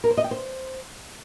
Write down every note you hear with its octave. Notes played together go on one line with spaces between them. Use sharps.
A#4
C5
D#5
G5
C5